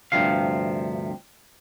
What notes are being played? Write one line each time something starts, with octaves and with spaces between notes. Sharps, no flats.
D2 G2 C3 F3 F5